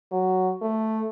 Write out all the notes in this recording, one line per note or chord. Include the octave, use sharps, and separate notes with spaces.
F#3
A3